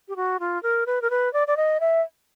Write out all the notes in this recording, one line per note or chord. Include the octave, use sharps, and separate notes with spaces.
G4
F#4
F4
A#4
B4
A#4
B4
D5
D5
D#5
E5